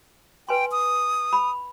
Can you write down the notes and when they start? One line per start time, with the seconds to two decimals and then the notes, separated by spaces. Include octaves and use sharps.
0.49 B4 G5 G#5 C6
0.72 D#6
1.33 B5